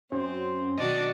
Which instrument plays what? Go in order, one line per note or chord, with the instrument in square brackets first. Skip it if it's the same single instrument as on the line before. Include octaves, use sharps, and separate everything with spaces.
[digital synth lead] F#2 [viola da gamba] C4 [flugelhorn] C5
[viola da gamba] B2 D#3 F#3 [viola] D4 F#4 [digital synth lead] D#5